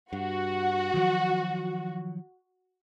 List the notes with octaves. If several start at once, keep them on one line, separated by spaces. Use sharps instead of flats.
G2 F#4
D#3 F3 F#3